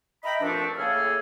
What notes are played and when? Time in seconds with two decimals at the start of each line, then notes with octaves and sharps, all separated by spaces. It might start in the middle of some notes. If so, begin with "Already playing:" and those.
0.23 D#5 E5 G5 A#5 B5
0.41 G2 A#2 F3 A3 C4 D4
0.77 A2 C#3 A#3 G#4 A4 F6